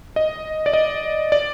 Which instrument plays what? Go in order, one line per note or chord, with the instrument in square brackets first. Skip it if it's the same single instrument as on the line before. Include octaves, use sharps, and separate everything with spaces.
[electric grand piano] D#5
D5
D#5
D5